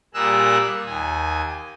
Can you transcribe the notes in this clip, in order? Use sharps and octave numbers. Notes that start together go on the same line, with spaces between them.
A#2 G3 G#4 A#4 E6 F#6
D#2 G#5